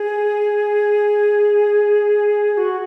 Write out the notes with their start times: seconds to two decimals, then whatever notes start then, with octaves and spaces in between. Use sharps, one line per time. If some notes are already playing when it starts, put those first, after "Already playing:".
Already playing: G#4
2.54 G#4
2.57 F#4